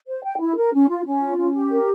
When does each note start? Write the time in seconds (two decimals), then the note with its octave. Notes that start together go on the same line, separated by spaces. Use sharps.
0.07 C5
0.24 G5
0.40 E4
0.56 A#4
0.73 C#4
0.89 F4
1.06 C#4
1.21 F4
1.39 C#4
1.54 G4
1.71 A#4